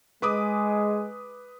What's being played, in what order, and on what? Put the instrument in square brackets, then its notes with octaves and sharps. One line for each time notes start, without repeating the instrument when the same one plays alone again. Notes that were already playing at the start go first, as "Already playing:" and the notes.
[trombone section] G#3 [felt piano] B4 D6 D#6